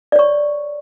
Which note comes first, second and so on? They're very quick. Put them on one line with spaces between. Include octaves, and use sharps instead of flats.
D5 C#5 C#6